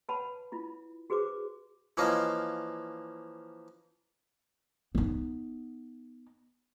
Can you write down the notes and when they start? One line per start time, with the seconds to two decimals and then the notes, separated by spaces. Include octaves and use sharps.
0.09 B4 C#5 F#5 A5 B5
0.52 E4 F4 B5
1.10 F#4 G#4 B4 C5 D6
1.97 E3 F3 A#3 C#4 D#5 F5
4.95 B3 D#4